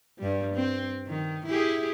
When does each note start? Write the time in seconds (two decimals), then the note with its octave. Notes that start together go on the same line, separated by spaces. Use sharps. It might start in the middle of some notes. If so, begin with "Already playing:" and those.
0.19 G2 G3
0.54 C4
1.07 D#3
1.46 E4 G4 G#4